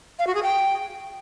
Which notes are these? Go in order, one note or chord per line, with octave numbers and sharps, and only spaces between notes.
F5
F#4
G#4
G5